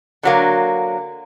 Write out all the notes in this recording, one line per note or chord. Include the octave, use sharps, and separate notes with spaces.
D3 F#3 A#3